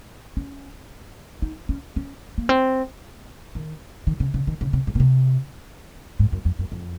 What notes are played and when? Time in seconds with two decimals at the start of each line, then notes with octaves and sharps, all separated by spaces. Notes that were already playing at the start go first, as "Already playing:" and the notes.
0.37 C#4
1.42 D#4
1.69 C#4
1.96 C#4
2.38 A#3
2.49 C4
3.55 D#3
4.07 D#3
4.20 C#3
4.34 C#3
4.47 D#3
4.61 C#3
4.73 C3
4.87 G#2
4.95 A#2
5.00 C3
6.19 G#2
6.32 F#2
6.45 F2
6.59 F#2
6.72 F2